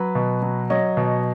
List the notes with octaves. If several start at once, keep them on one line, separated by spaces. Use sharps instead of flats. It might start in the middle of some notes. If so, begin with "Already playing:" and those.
Already playing: F#3 B4
B2
F#3
F#3 C#5 D#5
B2